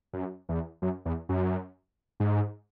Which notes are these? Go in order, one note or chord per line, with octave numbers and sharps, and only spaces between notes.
F#2
E2
F#2
E2
F#2
G#2